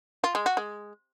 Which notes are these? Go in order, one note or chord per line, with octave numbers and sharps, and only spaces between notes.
F4
G#3
F#4
G#3